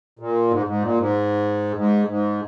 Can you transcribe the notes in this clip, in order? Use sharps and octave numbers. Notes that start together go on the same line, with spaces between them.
A#2
G#2
G#2
A#2
G#2
G#2
G#2